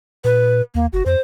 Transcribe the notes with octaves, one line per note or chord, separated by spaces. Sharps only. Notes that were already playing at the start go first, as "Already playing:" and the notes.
A#2 B4
D#2 A#3
F#1 F#4
F2 C5